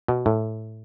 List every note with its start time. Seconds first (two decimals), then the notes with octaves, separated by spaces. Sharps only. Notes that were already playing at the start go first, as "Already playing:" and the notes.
0.08 B2
0.26 A2